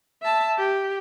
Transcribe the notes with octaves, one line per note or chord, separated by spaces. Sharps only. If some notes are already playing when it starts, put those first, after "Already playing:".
E5 A5
G4